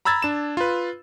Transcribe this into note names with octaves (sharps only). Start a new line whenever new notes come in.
A#5 B5 E6 G#6 A6
D4 E7
F4 B4